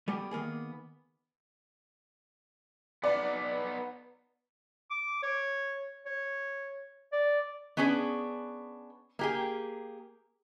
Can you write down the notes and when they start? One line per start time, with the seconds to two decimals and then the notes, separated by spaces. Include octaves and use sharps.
0.08 G3 A3 B3 G4 G#4
0.31 D#3 A#3 B3 G#4
3.04 B3 D#4 D5
4.91 D6
5.23 C#5
6.06 C#5
7.12 D5
7.77 B3 C#4 D4 G#4 B4
9.19 A#3 G4 G#4